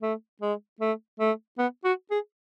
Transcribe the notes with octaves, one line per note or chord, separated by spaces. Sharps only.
A3
G#3
A3
A3
B3
F#4
G#4